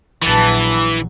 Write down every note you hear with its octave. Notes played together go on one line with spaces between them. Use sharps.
A#1 E3 F#3 B3 B4 A5